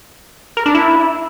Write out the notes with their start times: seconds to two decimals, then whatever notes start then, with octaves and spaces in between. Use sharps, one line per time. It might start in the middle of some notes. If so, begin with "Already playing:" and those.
0.57 A#4
0.66 D4
0.75 E4